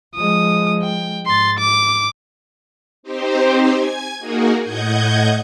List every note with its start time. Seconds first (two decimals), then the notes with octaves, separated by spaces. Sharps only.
0.16 F3 G#3 D#6
0.83 G5
1.26 G#2 C6 A6
1.59 D6
3.03 C4 D#4 G4 C5
3.73 G#5 G#6
4.19 A#3 D#4 F#4 G#4 A#4
4.62 A2 D#5 F#5 G6 G#6